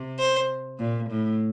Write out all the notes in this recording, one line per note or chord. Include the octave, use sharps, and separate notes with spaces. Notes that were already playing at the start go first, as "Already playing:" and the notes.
Already playing: C3
C5
A#2
A2